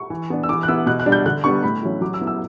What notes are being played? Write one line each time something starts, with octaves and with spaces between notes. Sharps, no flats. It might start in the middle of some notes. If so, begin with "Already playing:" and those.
Already playing: C#6
E3
B3 D4
E6
E3 D6
F#6
B3 E4 E6
B2 F#6
F#6
G3 D4
G6
D3 F#6
G3 B3 D4 C#6
A2 B5
F#3 C#4 E4
F#3 D6
E6
B3 E4
E6